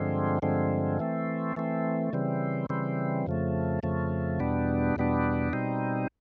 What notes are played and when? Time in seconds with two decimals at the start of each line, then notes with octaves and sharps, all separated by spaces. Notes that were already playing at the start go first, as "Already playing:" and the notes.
Already playing: G2 D3 F3 G#3 C4
0.42 G2 D3 F3 G#3 C4
0.99 E3 A3 C4
1.56 E3 A3 C4
2.13 C#3 E3 G3 C4
2.69 C#3 E3 G3 C4
3.26 F2 C#3 F3 A3
3.83 F2 C#3 F3 A3
4.40 E2 B2 G3 B3 D4
4.96 E2 B2 G3 B3 D4
5.53 B2 G3 C4 D#4